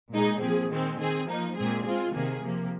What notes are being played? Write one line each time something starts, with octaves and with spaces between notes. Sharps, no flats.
A#2 G#3 D#4 G#4
A#2 F3 C4 G#4
D#3 G#3 C4
D#3 C4 G#4
F3 A#3 D#4
A#2 G#3 C4 G#4
G#3 C4 F4 G#4
C3 D#3 A#3 G#4
C3 F3 A#3